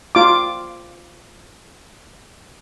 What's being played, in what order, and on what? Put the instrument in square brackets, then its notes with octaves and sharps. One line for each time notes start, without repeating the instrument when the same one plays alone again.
[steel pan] F4 D6